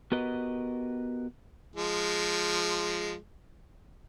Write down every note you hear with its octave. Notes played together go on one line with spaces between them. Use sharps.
B3 F#4 G4 A#4 B4 D#5
F3 G#3